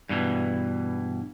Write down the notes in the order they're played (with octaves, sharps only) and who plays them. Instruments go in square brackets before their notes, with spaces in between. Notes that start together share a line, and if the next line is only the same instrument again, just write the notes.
[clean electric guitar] G2 B2 E3